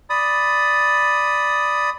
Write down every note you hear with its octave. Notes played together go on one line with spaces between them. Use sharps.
D5 B5 D#6